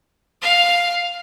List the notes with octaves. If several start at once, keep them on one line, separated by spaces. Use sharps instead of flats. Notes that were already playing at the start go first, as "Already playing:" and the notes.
F5